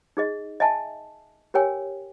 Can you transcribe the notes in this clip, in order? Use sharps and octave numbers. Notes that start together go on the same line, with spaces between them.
D#4 G#4 D#5
D#5 E5 G#5 A5
G4 A#4 C#5 G5 G#5